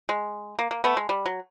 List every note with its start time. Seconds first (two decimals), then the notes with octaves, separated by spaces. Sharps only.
0.09 G#3
0.59 A#3
0.71 A#3
0.84 A3 B3
0.97 G#3
1.09 G3
1.26 F#3